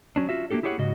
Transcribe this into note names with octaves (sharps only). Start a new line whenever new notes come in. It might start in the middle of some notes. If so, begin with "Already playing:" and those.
F#3 C#4 D4
F4 F#4 E5
A#3 C4 D4 G4 A4
E4 G4 G#4 C#5 D#5 F#5
G#2 C#3 F#4 D#5